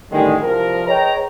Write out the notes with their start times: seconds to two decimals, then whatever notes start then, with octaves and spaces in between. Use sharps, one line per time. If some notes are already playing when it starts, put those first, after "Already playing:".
0.12 A1 D3 D#3 G3 G#3
0.42 C2 F3 A#4
0.86 G#4 B4 C#5 D#5 G5 A#5